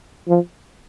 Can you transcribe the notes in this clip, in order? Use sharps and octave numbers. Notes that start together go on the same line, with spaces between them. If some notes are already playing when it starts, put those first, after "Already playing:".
F3